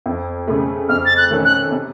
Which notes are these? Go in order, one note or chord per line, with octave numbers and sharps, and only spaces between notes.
F2
C#3 A3
F2 F6
A6
F#6
D#3 A3 C#4 A4
F#6
C3